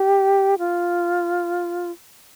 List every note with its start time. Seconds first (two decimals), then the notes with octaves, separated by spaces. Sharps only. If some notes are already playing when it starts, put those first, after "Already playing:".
Already playing: G4
0.58 F4